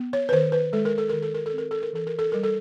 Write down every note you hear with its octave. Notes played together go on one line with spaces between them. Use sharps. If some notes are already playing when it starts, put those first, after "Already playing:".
Already playing: B3
C#5
B4
D#3 C5
B4
G#3 A4
A#4
A4
D#3 A#4
A4
A#4
A4
C4
A#4
A4
A#4
E3 A4
A#4
A4
G3 A#4
A4